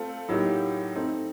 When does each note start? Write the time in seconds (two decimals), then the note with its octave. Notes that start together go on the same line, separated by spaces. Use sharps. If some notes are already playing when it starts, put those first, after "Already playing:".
Already playing: A3 C4 F4 A4
0.28 A2 F#3 A#3 D#4 G4
0.96 A3 C4 D#4